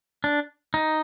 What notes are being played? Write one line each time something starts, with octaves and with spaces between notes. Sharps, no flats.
D4
D#4